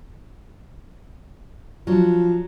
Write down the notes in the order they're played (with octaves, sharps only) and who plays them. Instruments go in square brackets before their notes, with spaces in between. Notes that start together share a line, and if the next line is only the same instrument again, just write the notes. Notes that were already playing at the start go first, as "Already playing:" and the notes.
[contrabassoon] F3 [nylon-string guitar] F#3 D4